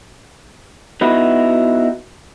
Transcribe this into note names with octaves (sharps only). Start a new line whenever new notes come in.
B3 D#4 E4 F#4